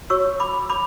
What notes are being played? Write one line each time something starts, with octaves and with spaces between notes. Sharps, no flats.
F#4 C#5 C#6 E6
B5 D6
B5 D6